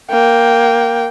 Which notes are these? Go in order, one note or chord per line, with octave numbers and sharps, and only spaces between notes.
A#3 G5